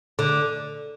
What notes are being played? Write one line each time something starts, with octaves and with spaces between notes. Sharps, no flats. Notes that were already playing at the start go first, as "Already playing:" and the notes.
D3